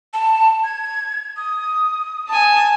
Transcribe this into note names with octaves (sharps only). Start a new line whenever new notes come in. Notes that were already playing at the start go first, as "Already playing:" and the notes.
A5
G#6
D#6
G#5 A5